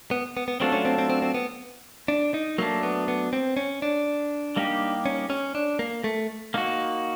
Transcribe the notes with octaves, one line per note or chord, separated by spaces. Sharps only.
B3
B3
B3
F#3 A3 C4 D4 F4 A4
C#4
C4
C4
C4
C4
B3
D4
D#4
F#3 A3 A#3 D4
B3
B3
C4
C#4
D4
G3 A#3 D#4 G4
C#4
C#4
D4
A#3
A3
A#3 D#4 F#4